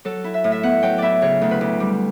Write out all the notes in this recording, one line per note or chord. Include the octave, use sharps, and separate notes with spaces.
F#3 A4
E4
E5
A2
E5
B3 F#5
F#3 G5
E4 D5 E5
C#3 C#5
D2
B4
D2
G3